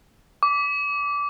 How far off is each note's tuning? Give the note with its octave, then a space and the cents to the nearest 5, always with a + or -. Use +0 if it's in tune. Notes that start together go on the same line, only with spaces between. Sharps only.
D6 -20